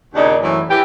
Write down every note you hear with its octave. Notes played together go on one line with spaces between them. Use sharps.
D#2 A#2 C#3 D4 D#4
F#2 A2 E3
E3 G4